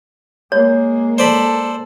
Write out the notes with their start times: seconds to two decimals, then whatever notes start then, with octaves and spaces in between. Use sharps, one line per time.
0.52 G#3 A#3 C#5
1.18 A4 C5 D5 B5